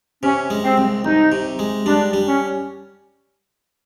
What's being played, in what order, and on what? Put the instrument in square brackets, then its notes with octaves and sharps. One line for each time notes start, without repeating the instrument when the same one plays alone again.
[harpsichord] C3 [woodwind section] C#4
[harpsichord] G#3
[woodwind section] C4
[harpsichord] C2
[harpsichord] C2 [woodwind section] D#4
[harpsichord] C3
G#3
[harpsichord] G3 [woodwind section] D4
[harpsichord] G3
[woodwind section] C#4